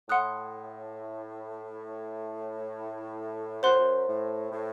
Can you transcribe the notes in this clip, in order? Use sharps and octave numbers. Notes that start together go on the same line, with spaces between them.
A2 F#5 C6 D#6 F#6
F#2 C5 F#5 C6 F#6
A2
F#2
A2
A2